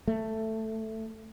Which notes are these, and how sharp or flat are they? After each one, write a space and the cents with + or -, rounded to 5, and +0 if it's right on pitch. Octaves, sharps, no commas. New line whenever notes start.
A3 +5